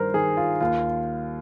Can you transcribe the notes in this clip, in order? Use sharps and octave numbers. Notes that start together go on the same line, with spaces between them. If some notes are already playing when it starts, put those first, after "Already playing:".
Already playing: G2 D#3 A#4 C5
D#3 G#4
F4
D#2 F4